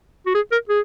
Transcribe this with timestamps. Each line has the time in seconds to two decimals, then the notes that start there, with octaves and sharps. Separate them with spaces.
0.26 F#4
0.35 G#4
0.52 A#4
0.69 G#4